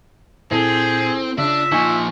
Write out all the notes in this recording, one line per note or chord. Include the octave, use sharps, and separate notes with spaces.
A#2 C4 E4 G#4 A4
C#3 D4 F4 E5
A#2 F3 D#4 G#5 C#6